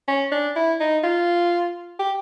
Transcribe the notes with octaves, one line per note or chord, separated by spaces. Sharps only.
C#4
D4
E4
D#4
F4
G4